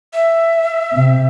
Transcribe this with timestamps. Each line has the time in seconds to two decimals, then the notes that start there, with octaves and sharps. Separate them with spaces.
0.13 E5
0.93 C3